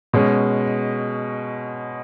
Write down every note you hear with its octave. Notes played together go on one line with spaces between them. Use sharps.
B2 G#3 C#4